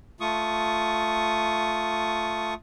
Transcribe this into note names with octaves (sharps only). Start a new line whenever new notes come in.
A3 F4 C#6 D#6